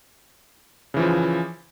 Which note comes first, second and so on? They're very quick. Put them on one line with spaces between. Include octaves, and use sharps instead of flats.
C#3 E3 F3